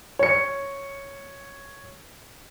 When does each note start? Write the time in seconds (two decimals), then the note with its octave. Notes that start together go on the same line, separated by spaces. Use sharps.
0.19 C#5 C#7